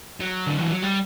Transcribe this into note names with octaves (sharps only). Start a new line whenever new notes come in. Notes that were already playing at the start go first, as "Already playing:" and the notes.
F#3
D3
E3
F#3
G3